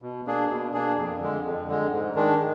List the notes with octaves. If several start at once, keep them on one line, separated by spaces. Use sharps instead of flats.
B2
A#3 D4 G#4
B2
A#3 D4 G#4
F2
D3 G#3
F2
D3 G#3
G#2
D#3 G#3 D4